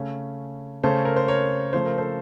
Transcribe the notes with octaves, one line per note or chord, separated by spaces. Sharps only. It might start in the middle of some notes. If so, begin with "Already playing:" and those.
Already playing: C#3 A3 C#4
C#3 A3 C#4 A4 C5
A#4
C5
A#4 C#5
C#3 F3 A3 C5
A#4
A4 C5